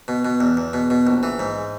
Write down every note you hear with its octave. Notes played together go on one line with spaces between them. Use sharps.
B2
B2
E2
E2
B2
B2
A#1
E3
G#2